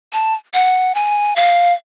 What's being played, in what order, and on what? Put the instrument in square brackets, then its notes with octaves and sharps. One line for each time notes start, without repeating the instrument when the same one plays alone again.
[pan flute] A5
F#5
G#5
F5